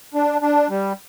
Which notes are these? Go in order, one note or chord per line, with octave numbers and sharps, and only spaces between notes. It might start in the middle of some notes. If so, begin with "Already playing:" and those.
D4
D4
G3